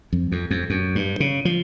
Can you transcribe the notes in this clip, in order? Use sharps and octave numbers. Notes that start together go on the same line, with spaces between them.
F2
F2
F2
F#2
G2
C#3
F3